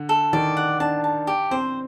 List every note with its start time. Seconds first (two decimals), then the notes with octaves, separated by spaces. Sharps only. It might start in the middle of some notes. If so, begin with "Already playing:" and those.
Already playing: D3
0.09 A4
0.33 D#3 D5
0.57 F#5
0.80 D4 A5
1.04 A5
1.27 G4
1.51 C4 C5